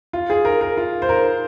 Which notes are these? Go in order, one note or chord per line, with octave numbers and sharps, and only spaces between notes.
F4
G#4
A#4
A#4
F4
C5
A#4